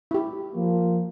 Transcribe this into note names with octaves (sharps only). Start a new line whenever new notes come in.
E4 G4
F3 A#3